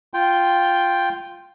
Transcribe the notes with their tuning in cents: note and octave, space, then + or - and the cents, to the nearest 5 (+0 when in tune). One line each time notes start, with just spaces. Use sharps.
F4 +0 G5 +0